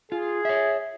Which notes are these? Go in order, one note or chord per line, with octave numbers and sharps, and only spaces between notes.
F4 G#4
C#5 E5